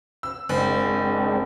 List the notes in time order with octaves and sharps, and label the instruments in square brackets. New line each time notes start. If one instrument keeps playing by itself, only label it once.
[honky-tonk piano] E6
[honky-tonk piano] F#1 [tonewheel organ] G#3 C4 D4